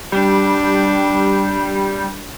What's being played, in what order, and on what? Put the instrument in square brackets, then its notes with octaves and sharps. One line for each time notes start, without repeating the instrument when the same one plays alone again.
[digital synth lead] G3 [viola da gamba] D4